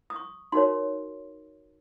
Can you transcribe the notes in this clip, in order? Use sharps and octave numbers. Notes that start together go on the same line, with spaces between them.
D#6
C#6
D#4 F#4 A#4 C#5 C6